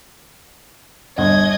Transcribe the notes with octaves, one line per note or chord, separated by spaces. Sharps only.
G1 D#5 G#6